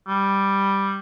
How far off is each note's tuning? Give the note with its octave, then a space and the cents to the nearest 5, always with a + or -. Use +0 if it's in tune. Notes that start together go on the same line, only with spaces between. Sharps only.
G3 +0